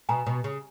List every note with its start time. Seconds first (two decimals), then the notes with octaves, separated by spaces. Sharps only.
0.09 B2 G#5 A#5
0.26 B2
0.44 C#3